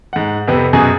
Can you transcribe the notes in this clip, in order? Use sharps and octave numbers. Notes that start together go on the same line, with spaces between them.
G#2 F#5
F2 C3 B3
F#2 B2 G#4